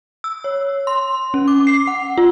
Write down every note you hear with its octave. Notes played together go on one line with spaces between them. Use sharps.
E6
C#5
C6
C#4
D6
C7
F#5
F4